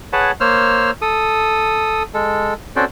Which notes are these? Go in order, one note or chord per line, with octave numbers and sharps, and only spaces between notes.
G#4 B4 C#5 F#5 A5
A#3 C5 C#5 E6 F6
A4 D#6
G#3 A4
C4 C#4 F#4 A4 C5 D5